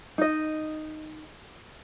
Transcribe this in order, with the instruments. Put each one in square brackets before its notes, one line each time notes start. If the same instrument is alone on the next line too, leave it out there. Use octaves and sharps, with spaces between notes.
[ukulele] D#4 D#5